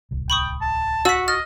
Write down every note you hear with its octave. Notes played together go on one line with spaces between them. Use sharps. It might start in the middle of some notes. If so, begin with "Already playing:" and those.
D1 C2
G5 B5 C#6 D#6
A5
F#4 F#5 E6 B6
D#5 F6 A6